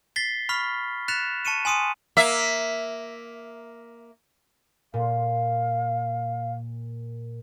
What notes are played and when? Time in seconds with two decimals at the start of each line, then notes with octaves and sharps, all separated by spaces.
0.16 A6 B6 C7 G7
0.49 B5 C#6 F6 B6
1.08 F#6 A6 B6 C#7 E7 F7
1.45 A5 C#6 C#7 D#7 E7
1.65 G#5 C6 D#6 C#7 D#7
2.17 A#3 E5
4.94 A#2 F5